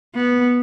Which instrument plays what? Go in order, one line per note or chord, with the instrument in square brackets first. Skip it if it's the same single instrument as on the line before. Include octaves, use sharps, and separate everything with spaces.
[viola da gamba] B3